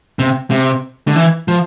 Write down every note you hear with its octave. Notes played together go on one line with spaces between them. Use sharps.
C3
C3
D3
E3
F3